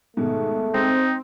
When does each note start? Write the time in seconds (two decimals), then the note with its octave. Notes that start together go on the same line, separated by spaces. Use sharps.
0.17 G#2 B2 D#3 A3
0.74 G#3 C4 D#4